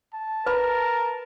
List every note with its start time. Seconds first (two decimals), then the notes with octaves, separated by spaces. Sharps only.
0.14 A5
0.46 A#4 B4 B5